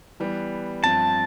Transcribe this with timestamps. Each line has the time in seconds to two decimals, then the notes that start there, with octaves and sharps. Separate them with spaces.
0.20 E3 G3 B3
0.83 G2 F3 C4 A5